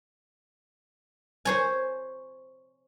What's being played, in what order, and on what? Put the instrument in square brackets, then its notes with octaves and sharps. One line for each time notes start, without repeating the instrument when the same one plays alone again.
[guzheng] C5 C#5 G#5